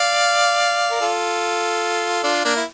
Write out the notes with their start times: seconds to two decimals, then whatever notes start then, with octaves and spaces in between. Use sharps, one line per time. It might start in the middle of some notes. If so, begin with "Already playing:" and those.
Already playing: D5 F5
0.91 A#4
1.01 F4 A4
2.24 D4 F4
2.45 A#3 D4
2.56 E4